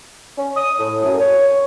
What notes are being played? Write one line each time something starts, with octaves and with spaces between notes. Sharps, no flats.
C#4
D#6
A2
F#2
C#5